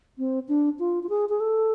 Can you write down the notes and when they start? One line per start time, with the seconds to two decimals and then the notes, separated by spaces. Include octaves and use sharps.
0.18 C4
0.48 D4
0.79 F4
1.03 F4
1.09 G#4
1.29 G#4
1.40 A4